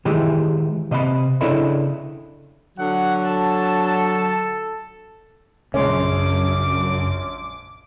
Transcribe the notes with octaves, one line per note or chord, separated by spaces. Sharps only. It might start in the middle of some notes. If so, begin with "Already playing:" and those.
D#3 E3 G#3 E4 G4 G#4
C3 D#5 E5 B5
C#3 D4 E4 A4 D#5 B5
D3 F#3 F#5
A4 A5
A#1 F#2 C#3 G#3 C#4 D6